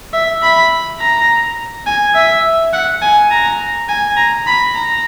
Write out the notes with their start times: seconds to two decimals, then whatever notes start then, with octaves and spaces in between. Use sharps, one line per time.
0.13 E5
0.42 B5
1.00 A#5
1.86 G#5
2.15 E5
2.73 F#5
3.02 G#5
3.31 A#5
3.89 G#5
4.17 A#5
4.47 B5
4.75 A#5